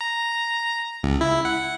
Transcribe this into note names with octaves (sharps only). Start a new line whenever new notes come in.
A#5
C#2
E4
F#5